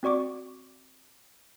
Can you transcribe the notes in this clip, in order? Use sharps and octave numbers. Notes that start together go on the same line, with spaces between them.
C4 F#4 D5 C#6 D6